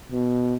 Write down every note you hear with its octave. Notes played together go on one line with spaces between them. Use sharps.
B2